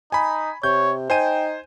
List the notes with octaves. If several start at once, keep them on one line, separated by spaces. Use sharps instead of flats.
D#4 G#5 B5
C3 C#5 G6
D#4 C5 G5 G#5 D#7